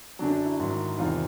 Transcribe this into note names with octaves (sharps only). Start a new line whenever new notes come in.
F#2 D3 F#3 D4
E4
G#2 D#3 F#3
E2 C3 D#3 F4